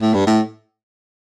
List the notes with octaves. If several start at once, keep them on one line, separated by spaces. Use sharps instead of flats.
A2
G2
A2